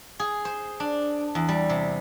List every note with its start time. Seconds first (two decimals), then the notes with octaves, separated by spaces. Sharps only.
0.20 G#4
0.45 C5
0.80 D4
1.35 E2
1.49 G3
1.69 C3